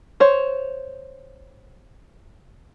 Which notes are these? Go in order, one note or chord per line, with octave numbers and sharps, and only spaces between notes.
C5 C#5